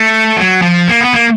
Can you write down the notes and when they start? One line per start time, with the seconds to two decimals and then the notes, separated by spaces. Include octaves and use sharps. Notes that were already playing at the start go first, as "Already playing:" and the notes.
Already playing: A3
0.37 F#3
0.62 F3
0.89 A#3
1.01 B3
1.14 A#3